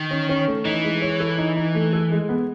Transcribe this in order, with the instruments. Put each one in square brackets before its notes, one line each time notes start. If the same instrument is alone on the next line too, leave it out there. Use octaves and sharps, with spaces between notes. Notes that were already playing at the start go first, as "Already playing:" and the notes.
Already playing: [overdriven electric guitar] D#3
[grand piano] C#4
C#4
A3
[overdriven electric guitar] E3 [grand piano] D#4
[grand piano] G#3
C#5
A4
D#4
D#4
A3
A4
G#3
B3